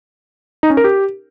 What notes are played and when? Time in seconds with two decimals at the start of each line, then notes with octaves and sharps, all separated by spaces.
0.63 D#4
0.70 C#4
0.77 A#4
0.84 G4